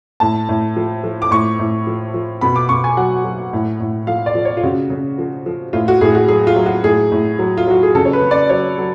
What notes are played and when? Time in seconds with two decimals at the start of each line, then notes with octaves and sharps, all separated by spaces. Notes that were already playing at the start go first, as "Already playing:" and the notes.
0.20 A2 A5
0.49 A2
0.76 F3
1.04 F3
1.22 D6
1.31 A2 C#6
1.59 A2
1.87 F3
2.14 F3
2.41 B2 B5
2.56 D6
2.69 B2 C#6
2.84 G#5
2.97 F#3 F#5
3.24 F#3
3.53 A2
3.80 A2
4.07 F3 F5
4.26 D5
4.35 F3
4.45 C#5
4.57 F4
4.63 C#3 F#4
4.90 C#3
5.18 F3
5.46 F3
5.73 A2 F4
5.88 F#4
6.01 A2 G#4
6.15 F#4
6.28 F#3 G#4
6.47 F4
6.56 F#3
6.66 F#4
6.84 A2 G#4
7.12 A2
7.39 F#3
7.57 F4
7.67 F#3 F#4
7.83 G#4
7.95 C#3 A4
8.05 C#5
8.13 B4
8.22 C#3
8.31 D5
8.49 F#3 C#5
8.78 F#3